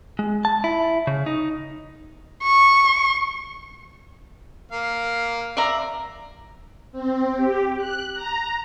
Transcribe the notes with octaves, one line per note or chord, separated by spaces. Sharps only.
G#3
A5
E4
C#3
D#4
C#6
A#3 F5
D5 E5 A#5
C4
G4
F#6
A#5